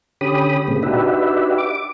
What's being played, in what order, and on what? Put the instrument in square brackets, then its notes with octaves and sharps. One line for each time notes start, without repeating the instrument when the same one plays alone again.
[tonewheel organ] D3 C#4 G4 B5 D#6
A#2 C#3 G#3 A#3 C4
D4 D#4 F#4 G4 B4 E5
D6